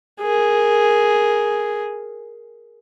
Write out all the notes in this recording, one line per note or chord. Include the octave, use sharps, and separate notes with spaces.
G#4 A#4